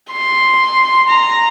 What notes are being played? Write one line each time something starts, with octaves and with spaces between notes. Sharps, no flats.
C6
A#5